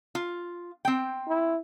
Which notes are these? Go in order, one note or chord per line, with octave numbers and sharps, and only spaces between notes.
F4
C4 G5
E4